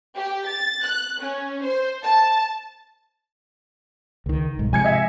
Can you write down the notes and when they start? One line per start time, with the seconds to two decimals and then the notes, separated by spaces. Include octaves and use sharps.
0.17 G4
0.47 A6
0.84 F#6
1.20 C#4
1.63 C5
2.03 A5
4.26 C#2 D#3
4.59 B1 G#2
4.73 C3 F3 G#3 G#5 G#6 C#7
4.84 D#5 E5 G#5